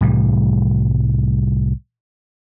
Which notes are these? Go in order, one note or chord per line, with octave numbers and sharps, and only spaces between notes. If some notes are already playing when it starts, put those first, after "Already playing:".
C2 A2 E3 G3